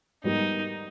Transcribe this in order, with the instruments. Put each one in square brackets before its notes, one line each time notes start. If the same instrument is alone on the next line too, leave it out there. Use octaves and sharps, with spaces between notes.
[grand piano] G#2 G3 B3 G4 A#4 [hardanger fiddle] D#4